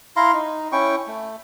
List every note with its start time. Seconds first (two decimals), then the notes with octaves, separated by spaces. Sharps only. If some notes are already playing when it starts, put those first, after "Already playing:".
0.16 E4 F5 A#5 C6
0.33 D#4
0.72 C#4 E4 G5 C#6
1.07 A3